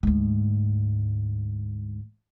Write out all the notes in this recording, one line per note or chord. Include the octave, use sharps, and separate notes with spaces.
D2 G#2